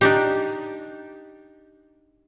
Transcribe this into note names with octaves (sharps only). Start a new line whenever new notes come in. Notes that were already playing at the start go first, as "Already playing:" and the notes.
D4 D#4 G4